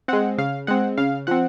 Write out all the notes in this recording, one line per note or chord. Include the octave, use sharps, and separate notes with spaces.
G#3 C4 F#5
C#3 F5
G#3 C4 F#5
C#3 F5
F3 C4 F#5